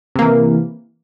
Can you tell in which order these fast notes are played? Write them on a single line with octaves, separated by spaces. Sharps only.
C3 A#3 E3